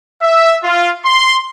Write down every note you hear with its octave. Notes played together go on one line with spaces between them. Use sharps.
E5
F4
C6